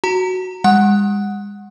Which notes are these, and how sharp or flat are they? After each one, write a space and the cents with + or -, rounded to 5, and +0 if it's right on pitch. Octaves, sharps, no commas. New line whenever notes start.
F#4 +0 A#5 -20
G#3 -35 F#5 -5